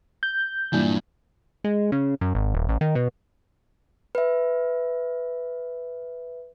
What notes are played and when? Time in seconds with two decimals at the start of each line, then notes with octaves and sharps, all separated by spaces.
0.23 G6
0.73 G2 A#2 E3 D4
1.64 G#3
1.92 C#3
2.21 F#2
2.35 G#1
2.54 D#1
2.69 A1
2.81 D#3
2.95 B2
4.15 B4 E5